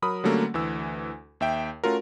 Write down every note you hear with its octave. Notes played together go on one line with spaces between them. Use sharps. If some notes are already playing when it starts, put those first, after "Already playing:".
F#3 A#4 B5 D#6
D3 F#3 G3 A3 A#3 C#4
D2 E3 E6
D#2 E5 G5
A3 C#4 F4 F#4 A#4